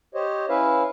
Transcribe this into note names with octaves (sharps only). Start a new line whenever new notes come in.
G4 C5 C#5 D#5
C#4 E4 B4 E5 F5